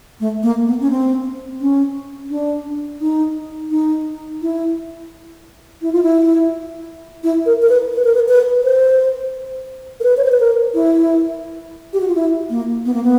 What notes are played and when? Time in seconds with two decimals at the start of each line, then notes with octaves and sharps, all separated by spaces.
0.20 A3
0.43 A#3
0.67 B3
0.80 C#4
0.90 C4
1.60 C#4
2.30 D4
3.01 D#4
3.71 D#4
4.42 E4
5.82 E4
5.92 F4
6.03 E4
7.23 E4
7.46 A#4
7.62 A#4
7.69 B4
7.94 B4
8.04 A#4
8.15 B4
8.28 B4
8.64 C5
10.00 A#4
10.03 B4
10.17 C#5
10.24 C5
10.32 B4
10.40 A#4
10.74 E4
11.93 G4
12.00 F#4
12.08 F4
12.15 E4
12.50 A#3
12.85 B3
12.94 A#3
13.03 B3